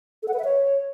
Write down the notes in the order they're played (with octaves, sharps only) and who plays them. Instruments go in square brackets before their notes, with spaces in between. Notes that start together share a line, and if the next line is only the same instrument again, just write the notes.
[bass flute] A4
F#5
B4
E5
C#5